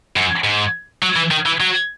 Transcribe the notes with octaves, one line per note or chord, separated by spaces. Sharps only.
F#2
G#2
F#3
E3
D#3
E3
F#3